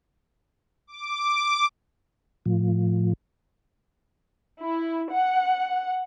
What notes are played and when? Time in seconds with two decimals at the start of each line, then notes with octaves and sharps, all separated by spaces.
0.87 D6
2.46 A2 F3
4.60 E4
5.12 F#5